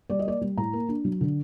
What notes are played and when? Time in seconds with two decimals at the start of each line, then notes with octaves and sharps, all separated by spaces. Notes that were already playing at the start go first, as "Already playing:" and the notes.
0.10 G3 D5
0.19 D#5
0.25 A#3 D5
0.41 G3
0.57 A2 A#5
0.73 A#3
0.89 D4
1.05 F#3
1.21 D3